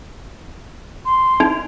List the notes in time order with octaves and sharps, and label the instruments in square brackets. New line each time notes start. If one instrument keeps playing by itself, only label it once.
[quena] C6
[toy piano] D#4